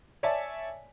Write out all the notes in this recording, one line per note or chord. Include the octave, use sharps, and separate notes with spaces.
C#5 D5 E5 G#5 A5